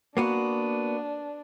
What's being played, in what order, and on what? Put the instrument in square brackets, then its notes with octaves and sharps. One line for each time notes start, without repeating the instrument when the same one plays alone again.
[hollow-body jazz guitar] A#3 B3 F#4 [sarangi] D4